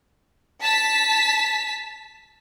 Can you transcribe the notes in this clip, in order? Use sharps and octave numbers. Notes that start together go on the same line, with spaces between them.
A5 B6